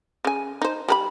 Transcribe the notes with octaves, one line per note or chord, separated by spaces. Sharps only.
C#3 G#5
D#4 C5
G3 A#4 B5